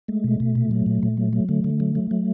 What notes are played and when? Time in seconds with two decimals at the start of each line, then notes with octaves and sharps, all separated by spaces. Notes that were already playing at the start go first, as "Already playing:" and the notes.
0.08 G#3 A3
0.24 B2
0.40 B2
0.55 A#2
0.71 F#3
0.86 A#2
1.03 A#2
1.17 F#3
1.33 F#3
1.49 D3 A3
1.64 D3
1.80 F#3
1.95 F#3
2.11 F#3